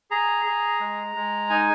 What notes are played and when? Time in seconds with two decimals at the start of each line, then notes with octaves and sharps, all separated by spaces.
0.11 G#4 A#5
0.45 G#4
0.80 G#3
1.15 G#3
1.50 D#4 G#5